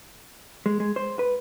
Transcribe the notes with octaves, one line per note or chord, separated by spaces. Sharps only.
G#3
G#3
C5
B4